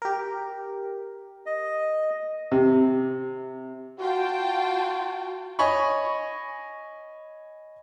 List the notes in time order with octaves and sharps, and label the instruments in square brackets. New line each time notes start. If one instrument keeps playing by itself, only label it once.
[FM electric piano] G4 A#4
[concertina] D#5
[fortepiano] C3
[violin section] F4 G5 A5 [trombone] F#4
[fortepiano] C#5 D#5 G#5 B5 C#6